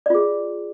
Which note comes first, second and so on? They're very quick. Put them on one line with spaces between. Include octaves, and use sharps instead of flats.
D5 F4 G#4